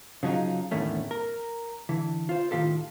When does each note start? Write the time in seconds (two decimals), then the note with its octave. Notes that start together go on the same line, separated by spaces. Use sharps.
0.23 C#3 F3 F#3 D#4
0.71 E2 A2 D3 D#3 A3 C#4
1.11 A#4
1.89 D3 E3
2.29 F4 C5
2.51 A2 D#3 F4 G4 A4